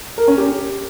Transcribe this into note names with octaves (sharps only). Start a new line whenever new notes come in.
A#4
C#4
G4